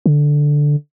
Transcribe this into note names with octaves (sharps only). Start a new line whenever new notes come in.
D3